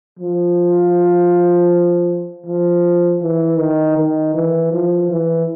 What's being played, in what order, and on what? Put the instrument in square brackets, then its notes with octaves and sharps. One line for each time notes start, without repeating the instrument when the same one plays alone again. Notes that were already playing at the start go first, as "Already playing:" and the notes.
[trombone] F3
F3
E3
D#3
D#3
E3
F3
E3